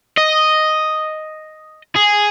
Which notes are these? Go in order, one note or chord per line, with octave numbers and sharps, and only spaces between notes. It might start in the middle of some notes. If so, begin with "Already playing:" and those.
D#5
G#4